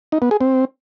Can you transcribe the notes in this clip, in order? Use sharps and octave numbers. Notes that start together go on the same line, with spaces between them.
D#4
B3
G#4
C4